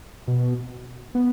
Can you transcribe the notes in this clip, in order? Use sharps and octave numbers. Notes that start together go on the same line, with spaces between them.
B2
B3